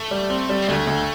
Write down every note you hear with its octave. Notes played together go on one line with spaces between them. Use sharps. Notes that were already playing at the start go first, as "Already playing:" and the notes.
Already playing: A3
G3
C4
G3
C4
D2 A3
D2